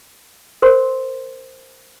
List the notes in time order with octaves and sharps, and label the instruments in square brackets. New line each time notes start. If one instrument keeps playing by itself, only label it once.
[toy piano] A#4 C5 C6